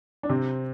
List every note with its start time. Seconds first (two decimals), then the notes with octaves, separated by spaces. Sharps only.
0.23 D4
0.29 C3 C4